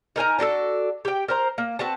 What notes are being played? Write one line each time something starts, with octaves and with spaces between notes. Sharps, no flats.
D#4 A#4 G#5 A#5
D4 F#4 G#4 A4
G4 G5
A#4 C5 A#5
A#3
C4 F#4 B4 A5